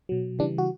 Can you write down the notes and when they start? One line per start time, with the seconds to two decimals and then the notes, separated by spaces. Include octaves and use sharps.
0.09 B2 F#3
0.39 C#3 E3 G3 D4
0.58 F#4